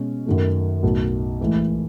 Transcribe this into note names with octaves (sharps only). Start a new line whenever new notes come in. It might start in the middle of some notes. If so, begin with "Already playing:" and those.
Already playing: B2 G#3 C#4
F#2 D#3 F#3 A3
B1 A2 F#3
A1 A2 E3 G#3